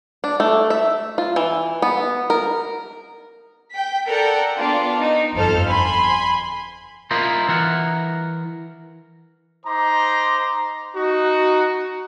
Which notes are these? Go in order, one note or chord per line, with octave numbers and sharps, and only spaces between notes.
D4
A3
E5
F4
E3
B3
A#4
G5 B6
A4 A#4 D5 F#5 G5
B3 D4 F4
D#4
G1 F2 F3 A4 C5 F6
G#5 B5 C6
E4 F4 A#4 C5 D#5
E3 A#4 F#5
D#4 C5 A#5 C6 D6
D#4 F#4